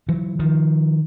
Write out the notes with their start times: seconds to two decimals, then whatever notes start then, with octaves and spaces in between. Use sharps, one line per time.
0.09 E3 F#3
0.39 D#3 F3